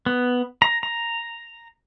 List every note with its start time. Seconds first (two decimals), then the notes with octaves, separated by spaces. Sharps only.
0.06 B3
0.62 A#5
0.83 A#5